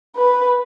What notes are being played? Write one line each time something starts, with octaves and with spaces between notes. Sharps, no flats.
B4